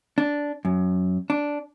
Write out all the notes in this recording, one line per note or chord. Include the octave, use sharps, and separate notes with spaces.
D4
F#2
D4